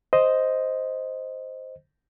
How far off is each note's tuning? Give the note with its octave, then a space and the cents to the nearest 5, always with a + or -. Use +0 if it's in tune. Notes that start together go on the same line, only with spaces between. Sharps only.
C5 +0 D#5 +0